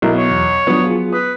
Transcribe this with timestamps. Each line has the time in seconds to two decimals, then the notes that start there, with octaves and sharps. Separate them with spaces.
0.02 B1 F#3 E4 A#4
0.15 B3 C#5
0.31 E2
0.67 F3 F#3 B3 D4 D#6
0.84 F4 G#4
1.12 B4 D#6